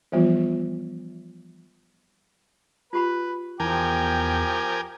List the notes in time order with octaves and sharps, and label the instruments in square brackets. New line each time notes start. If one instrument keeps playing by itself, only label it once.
[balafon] E3 F3 G3 B3 F4
[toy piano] F4 G4 B5 [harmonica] B4
[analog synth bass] E2 [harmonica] F3 G4 [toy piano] D#4 E4 [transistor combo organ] A#4 G5 G#5